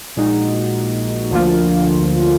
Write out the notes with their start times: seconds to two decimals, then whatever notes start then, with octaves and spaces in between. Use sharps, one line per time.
0.16 A#1 A#2 G#3 D#4 F#4
1.31 D2 D3 F3 A#3 F4